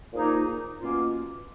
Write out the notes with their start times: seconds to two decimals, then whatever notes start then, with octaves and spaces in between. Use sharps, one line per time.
0.12 A#2 F3 A#3 D#4 G#4
0.78 B2 A#3 C#4 F4